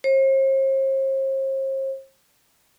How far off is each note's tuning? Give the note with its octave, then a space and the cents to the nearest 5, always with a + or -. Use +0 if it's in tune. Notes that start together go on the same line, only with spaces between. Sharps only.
C5 +40